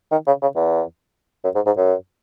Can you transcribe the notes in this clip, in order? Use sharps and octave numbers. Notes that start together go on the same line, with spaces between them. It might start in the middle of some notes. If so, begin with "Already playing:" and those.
D#3
C#3
C#3
E2
F#2
G#2
G#2
F#2